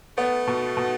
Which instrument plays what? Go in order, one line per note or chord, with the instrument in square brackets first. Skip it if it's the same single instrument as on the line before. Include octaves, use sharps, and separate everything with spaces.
[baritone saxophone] A3 [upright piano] B3
[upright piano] B2
B2